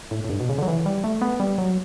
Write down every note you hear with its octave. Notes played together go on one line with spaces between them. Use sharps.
A2
A2
G2
B2
C#3
D3
F#3
E3
G3
A3
B3
G3
F#3